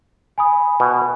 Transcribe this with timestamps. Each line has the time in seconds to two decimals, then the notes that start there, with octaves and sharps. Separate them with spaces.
0.38 G#5 B5 D#6
0.80 B2